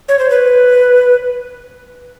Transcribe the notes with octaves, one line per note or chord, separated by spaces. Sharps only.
C#5
C5
B4